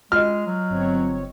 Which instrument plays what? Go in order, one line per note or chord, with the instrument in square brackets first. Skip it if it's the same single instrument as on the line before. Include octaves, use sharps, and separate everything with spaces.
[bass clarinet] G#3 [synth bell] F4 D#5 [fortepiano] F6
[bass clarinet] F#3
[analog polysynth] G1 C4 C#5